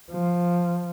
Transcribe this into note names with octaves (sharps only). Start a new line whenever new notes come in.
F3